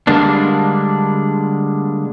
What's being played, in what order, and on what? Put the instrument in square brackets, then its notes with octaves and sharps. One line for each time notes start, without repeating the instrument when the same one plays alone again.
[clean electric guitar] D3 G3 G#3 A#3 D4